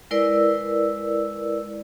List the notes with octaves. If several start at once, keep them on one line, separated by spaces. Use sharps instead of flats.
G#3 E4 A#4 B4 D5 E6